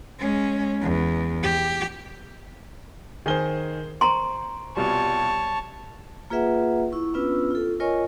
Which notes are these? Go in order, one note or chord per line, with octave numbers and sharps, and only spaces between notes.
G#3 C#4
E2
G4
D#3 G#4 A#4 C5 G#5 G7
C5 A#5 C6 C#6 D7
C2 B2 G3 F4 C#5 A5
A#3 F4 G#4 B4 E5 F#5
E4 C#6
B3 C#4 D4 F4 B4 E6
F4 A4
F4 A#4 C#5 D#5 G#5 C#6